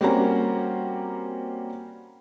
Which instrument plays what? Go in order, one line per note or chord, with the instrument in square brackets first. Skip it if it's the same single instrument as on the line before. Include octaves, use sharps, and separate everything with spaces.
[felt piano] G3 A#3 C4 C#4 F#4 A#5